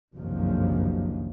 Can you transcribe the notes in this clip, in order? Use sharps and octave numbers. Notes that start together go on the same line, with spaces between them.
F#1 C2 G2 D#3 F3 F#3